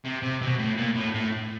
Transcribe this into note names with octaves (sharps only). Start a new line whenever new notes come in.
C3
C3
B2
A2
A#2
A2
A2